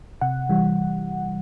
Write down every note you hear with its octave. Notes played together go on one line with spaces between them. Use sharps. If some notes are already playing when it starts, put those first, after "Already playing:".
C3 F#5
E3 G3